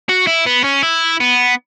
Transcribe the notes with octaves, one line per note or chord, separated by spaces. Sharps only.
F#4
E4
B3
C#4
E4
B3